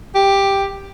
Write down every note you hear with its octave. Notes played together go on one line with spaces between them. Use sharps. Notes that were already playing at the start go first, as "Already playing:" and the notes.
G4